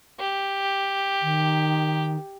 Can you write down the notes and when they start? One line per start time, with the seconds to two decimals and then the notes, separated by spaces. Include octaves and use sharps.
0.20 G4
1.21 D#3